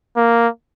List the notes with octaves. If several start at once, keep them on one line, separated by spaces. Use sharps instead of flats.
A#3